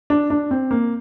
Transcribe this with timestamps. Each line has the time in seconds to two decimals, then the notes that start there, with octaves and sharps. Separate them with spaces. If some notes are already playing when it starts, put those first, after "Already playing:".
0.10 D4
0.30 D4
0.51 C4
0.71 A#3